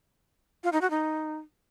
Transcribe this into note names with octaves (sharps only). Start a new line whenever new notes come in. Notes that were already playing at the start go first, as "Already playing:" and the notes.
F4
D#4
F#4
D#4